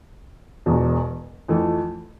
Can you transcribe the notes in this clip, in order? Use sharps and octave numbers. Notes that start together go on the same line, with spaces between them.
E1 E2 B2
F2 E3 A3